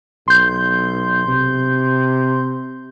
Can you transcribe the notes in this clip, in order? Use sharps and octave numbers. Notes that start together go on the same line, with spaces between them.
B1 C6 G6
C3